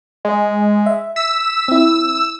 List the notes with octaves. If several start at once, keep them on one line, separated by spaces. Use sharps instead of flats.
G#3
E5
E6 B6
C4 E4